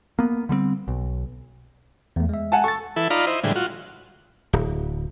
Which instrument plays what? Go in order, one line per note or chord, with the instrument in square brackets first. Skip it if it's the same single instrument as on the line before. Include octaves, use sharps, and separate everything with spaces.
[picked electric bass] A#3 B3
D3 G3 G#3 C4
B1
[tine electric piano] E2 A3
G#3 E5
[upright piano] F#5 G#5 A5
[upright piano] A4 [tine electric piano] C#6 A6
[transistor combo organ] E3 E4 A4
D#4 F4 D5 F5 A#5 B5
E4 C5 D#5
A2 D3 E3 G3 G#3
F4 F#4
[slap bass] D1